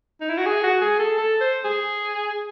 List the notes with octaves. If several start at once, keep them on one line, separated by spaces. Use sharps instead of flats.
D#4
E4
F#4
G#4
F#4
G#4
A4
A4
C5
G#4